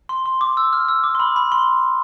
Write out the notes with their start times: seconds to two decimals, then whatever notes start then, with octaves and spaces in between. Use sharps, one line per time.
0.09 C6
0.26 C6
0.41 D6
0.57 E6
0.73 F6
0.88 E6
1.04 D6
1.15 C6
1.20 B5
1.36 B5
1.52 C6